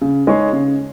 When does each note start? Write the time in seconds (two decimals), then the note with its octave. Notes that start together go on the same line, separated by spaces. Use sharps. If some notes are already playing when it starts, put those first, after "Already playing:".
0.01 C#3
0.27 G#3 D#4 G#4 C#5
0.53 C#3